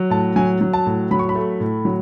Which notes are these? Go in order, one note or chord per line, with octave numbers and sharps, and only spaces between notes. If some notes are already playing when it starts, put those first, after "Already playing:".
Already playing: F#3
A2 A5
F#3 G#5
F#3
A5
A2
F#3 B5
C#6
B5
A3
A2
F#3